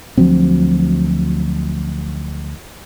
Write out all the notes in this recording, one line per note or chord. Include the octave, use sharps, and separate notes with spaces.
D2 F3 F#3 C4